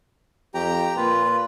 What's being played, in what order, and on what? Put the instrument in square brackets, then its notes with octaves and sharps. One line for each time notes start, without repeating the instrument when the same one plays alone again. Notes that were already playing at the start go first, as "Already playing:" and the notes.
[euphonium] F2 [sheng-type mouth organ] G4 G5 A#5
[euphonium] A#2 [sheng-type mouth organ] F4 B4